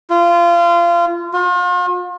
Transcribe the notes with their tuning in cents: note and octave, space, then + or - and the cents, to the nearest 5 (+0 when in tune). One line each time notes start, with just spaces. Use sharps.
F4 -25
F4 +40